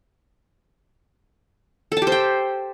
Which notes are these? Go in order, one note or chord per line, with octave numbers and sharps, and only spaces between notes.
A4
A5
G4
C5
G5